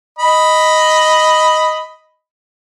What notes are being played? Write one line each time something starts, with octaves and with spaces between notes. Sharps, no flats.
D#5 B5